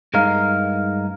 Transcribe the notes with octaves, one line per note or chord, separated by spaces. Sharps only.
G2 G#3 D#4 A#4 F5